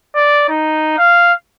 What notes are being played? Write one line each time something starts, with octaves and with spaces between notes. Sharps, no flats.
D5
D#4
F5